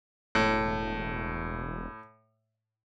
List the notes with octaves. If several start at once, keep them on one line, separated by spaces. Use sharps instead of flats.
E1 A2